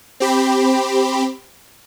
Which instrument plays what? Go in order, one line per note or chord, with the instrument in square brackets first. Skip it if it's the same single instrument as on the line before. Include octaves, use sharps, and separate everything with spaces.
[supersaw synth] C4 G4 B5